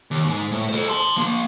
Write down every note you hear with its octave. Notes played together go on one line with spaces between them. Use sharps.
D#2
G#2
A2
A4 C5
A5 C6
F3 A#3